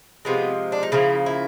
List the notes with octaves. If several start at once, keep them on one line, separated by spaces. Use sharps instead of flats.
C3 F3 G#3 B3
D4
D#4
C#3 F3 A#3 E4
E4